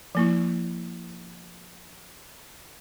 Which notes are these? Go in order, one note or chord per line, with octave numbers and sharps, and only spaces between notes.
F3 A#3 E4